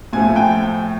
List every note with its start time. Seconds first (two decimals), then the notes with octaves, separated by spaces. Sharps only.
0.13 A2 F3 A3 G#5
0.36 G5